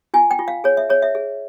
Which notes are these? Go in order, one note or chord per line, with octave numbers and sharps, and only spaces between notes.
F4 G#5
G5
F4
F5
G#4 C#5
E5
G#4 C#5
E5
G#4